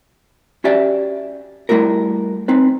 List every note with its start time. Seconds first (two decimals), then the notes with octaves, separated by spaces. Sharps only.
0.64 C#4 F#4 G4 D5 E5
1.69 G3 A3 E4 F#4 A#4
2.48 C4 D#4 B4